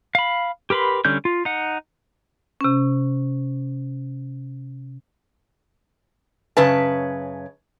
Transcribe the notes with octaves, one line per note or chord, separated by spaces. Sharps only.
F5 B5
G4 A#4 B4 B5 C6
D3 G3 C#4 G6
F4
D#4 F#5
C3 C#4
F#2 C#3 B4 A5